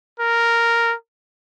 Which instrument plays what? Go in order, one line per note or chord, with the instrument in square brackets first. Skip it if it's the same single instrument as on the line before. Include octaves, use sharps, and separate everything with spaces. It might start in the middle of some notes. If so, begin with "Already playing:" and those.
[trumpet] A#4